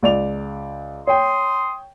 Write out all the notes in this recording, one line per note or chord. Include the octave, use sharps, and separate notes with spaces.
C#2 D5 F7
C#5 G5 C6 D#6